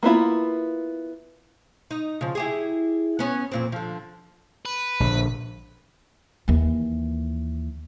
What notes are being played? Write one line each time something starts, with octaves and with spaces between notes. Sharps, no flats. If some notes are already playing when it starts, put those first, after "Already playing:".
A#3 B3 E4 F4
D#4
C#3 F3
E4 G4 G#4
B3 C#4 C#5
F2 A#2 C4
D3 F3
B4
A#1 D3
D#2 E3